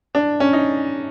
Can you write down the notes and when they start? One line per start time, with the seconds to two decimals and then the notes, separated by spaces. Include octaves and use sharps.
0.15 D4
0.40 C#4
0.53 D#4